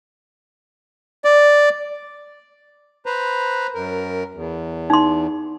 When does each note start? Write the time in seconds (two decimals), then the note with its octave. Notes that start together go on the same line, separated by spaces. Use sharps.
1.25 D5
3.06 B4 C5 A#5
3.75 F#2 A#4
4.34 E2
4.90 D#4 C6